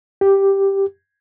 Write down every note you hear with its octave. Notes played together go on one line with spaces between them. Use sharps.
G4